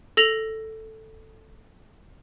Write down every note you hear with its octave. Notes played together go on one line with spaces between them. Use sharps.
A4 A#6 F7 F#7